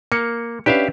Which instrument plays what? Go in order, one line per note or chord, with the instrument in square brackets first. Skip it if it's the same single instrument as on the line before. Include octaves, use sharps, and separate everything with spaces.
[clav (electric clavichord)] A#3 [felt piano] C#7
[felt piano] C#4 D4 B4 [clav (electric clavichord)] G4 E5 F5